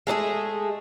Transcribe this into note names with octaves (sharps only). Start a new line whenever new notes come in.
G#3 A3 D4 G#4